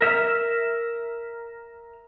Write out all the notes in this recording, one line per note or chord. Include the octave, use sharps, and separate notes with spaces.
A#4 E5 F6